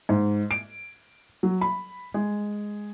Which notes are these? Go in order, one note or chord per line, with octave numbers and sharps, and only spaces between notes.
G#2
D7
F#3
B5
G#3